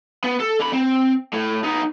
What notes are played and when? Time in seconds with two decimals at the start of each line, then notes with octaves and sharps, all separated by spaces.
0.24 B3
0.40 A4
0.60 D3 B5
0.73 C4
1.33 A2
1.64 B3 D#4